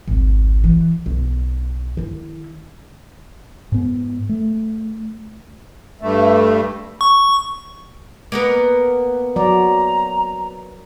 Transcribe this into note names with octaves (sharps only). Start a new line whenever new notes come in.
G#1 C#2
E3
B1
D#3 E4
G#2 B3
A3
G2 A3
C#6
A#3 B3 A#4
F#3 D5 A#5